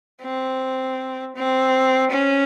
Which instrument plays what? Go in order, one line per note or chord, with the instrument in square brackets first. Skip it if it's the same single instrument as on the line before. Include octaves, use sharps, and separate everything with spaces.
[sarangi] C4
C4
C#4